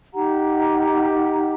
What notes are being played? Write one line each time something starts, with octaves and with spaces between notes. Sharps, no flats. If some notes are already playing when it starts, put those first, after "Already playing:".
D#4 G4 F#5 A#5